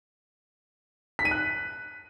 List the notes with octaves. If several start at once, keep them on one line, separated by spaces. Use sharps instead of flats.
B6
D#7
F#6